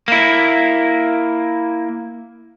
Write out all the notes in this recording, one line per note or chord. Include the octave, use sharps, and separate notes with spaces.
A#3 E4